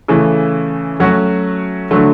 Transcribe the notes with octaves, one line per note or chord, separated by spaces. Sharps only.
C#3 E3 A3
F#3 A3 C#4 F#4
D3 F#3 A3